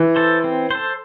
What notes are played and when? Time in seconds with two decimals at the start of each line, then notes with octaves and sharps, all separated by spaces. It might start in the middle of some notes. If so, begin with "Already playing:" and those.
Already playing: E3
0.16 A4 C5
0.44 C4
0.71 A4 C5